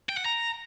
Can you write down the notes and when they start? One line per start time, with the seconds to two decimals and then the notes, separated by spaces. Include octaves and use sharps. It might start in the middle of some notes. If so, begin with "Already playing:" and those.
0.09 G5
0.17 F#5
0.25 A#5